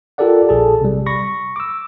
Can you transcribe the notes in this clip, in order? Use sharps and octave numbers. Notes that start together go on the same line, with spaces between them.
F4 G4 A4 A#4 D5 F#5
A#1 G#4 A4 A5
C3 G3
B5 C#6 A#6
D6 E6